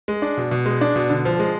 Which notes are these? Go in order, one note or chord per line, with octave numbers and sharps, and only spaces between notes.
G#3
D4
B2
B2
G#3
D4
B2
D3
F3
G#3